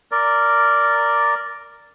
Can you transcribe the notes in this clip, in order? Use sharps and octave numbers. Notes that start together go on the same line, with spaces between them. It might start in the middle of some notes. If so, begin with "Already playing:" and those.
A#4 D5